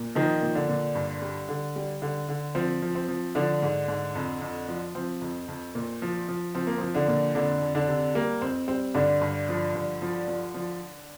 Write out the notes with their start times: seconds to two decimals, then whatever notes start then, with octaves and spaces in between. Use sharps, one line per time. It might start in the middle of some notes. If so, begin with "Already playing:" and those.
Already playing: A#2
0.15 D#3 F3 D#4
0.42 A#2
0.55 D3 D4
0.69 A#2
0.95 G2
1.22 G3
1.49 D3
1.76 G3
2.02 D3
2.29 D3
2.55 F3 C4
2.82 F3
2.95 C4
3.08 F3
3.35 D3 F3 D4
3.62 G#2
3.88 G#2
4.15 F2
4.41 F2
4.68 F3
4.95 F3 C4
5.21 F2
5.48 F2
5.75 A#2
6.02 F3
6.28 F3
6.55 F3 C4
6.67 A#3
6.77 F3 C4
6.94 D3 D4
7.08 A#2
7.35 F2 D3 D4
7.62 F2
7.75 D3 D4
7.88 C3
8.15 G3 A#3
8.41 F2 C4
8.68 G3 C4
8.94 G2 D3 D4
9.21 G2
9.49 F3
9.75 G2
10.02 F3
10.28 F3
10.54 F3